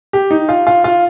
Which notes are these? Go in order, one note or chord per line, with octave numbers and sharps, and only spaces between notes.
G4
D#4
F4
F4
F4